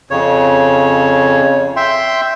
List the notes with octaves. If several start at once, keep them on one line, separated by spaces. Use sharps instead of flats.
F2 C#3 C#5
E5 G5 C6